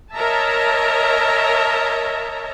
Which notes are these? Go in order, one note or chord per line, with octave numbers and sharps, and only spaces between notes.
A#4 C#5 D#5 E5 A5 A#5